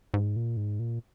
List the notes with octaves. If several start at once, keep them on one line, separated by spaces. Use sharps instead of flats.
G#2
A#2
G#2
A#2